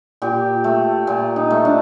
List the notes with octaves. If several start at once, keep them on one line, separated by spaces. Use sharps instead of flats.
A#2 G4
A3
A#2 F4
D#4
A3
D4